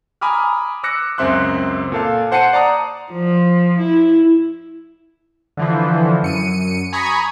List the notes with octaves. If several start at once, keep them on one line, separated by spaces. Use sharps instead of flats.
G#5 A#5 B5 D6 D#6 F6
D6 E6 F#6 A#6 C#7
C#2 F#2 C4 E5 C6 F#6
A#2 A4 F5
C5 F#5 A5 C7 C#7 D#7
D5 A5 A#5 D#6
F3
E4
D3 E3 F3
F#2 C#7 D#7
G#5 A#5 B5 C#6 D#6 G#6